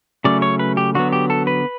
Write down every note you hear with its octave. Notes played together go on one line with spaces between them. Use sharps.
C#3 F#3 A3 C#4 D5
C#5
B4
G4
D3 F#3 B3 F#4
G4
A4
B4